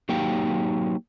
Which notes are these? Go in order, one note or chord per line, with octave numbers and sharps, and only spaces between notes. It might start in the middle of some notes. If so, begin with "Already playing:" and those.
F#3 A#3 D#4 G4 G5